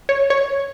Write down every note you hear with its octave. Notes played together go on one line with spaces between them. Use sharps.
C#5
C#5